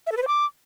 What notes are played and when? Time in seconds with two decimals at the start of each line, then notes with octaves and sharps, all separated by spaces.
0.07 E5
0.12 A4
0.17 B4
0.22 C5
0.28 D6